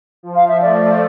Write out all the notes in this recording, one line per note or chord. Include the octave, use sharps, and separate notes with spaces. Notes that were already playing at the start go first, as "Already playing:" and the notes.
F3
F5
E5
A3 D5